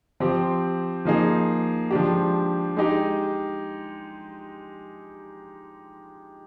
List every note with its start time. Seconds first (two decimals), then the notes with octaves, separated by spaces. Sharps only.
0.20 F3 C4 G4
1.05 F3 A#3 D#4 G#4
1.91 F3 G#3 D4 G4
2.77 G#3 D#4 G4